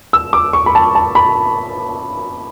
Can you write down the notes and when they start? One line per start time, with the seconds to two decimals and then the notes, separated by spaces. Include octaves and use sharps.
0.13 E6
0.33 D6
0.53 C#6
0.66 B5
0.75 A5
0.95 A5
1.15 B5